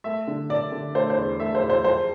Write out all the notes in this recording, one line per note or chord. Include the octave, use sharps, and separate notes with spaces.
A3 E5
D3
D4 D5
D3
A3 C5
C5
E2
A3 E5
C5
E2
C5
F2 C5